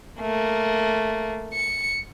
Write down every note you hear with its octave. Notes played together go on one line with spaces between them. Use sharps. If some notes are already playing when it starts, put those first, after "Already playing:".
A3 A#3
C#7